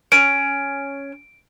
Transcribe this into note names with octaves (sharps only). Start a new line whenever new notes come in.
C#4 D7